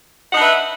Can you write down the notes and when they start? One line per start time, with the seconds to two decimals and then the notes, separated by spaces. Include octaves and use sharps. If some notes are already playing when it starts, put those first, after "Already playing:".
0.31 F#5
0.33 D#4
0.36 D4
0.39 B4
0.42 E5